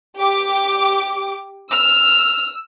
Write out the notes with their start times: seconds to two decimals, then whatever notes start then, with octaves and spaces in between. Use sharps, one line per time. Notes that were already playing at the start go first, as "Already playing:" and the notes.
0.17 G4 D6
1.71 E6 F6